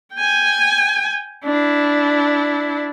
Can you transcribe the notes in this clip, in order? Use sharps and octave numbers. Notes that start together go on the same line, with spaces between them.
G5 G#5
D4 E4